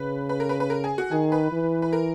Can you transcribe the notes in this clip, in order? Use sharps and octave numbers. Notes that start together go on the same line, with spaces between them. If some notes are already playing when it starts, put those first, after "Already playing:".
Already playing: C#3 B4
B4
A#4
B4
B4
A#4
G#4
F#4
D#3 G#4
B4
E3
B4
A#4